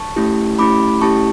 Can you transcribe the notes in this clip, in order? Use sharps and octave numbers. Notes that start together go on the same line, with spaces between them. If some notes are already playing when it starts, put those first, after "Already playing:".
Already playing: A5 C#6
A3 C#4 E4 G4
A3 C#4 E4 G4 B5 D6
A3 C#4 E4 G4 A5 C#6